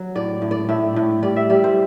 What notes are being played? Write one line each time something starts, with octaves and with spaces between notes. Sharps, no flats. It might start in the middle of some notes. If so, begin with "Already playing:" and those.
Already playing: F#3
A2 D5
A2
D5
A2 E5
A2
G3 D5
E5
G3 D5
C5